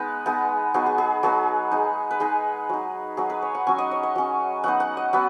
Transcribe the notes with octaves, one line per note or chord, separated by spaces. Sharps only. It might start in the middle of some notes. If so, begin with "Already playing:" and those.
Already playing: G#3 B3 D#4 B4
G#3 B3 D#4
F#3 B3 D#4 G#4
G#4
G#4
F#3 B3 D#4 G#4
G#3 D#4
B4
G#3 D#4 G#4
F#3 D#4
F#3 D#4 G#4
B4
C#5
F#5
F#3 C#4 G#5
D#5
C#5
D#5
F#3 C#4
F#3 B3 D#4 F#5
F#5
D#5
F#3 B3 B4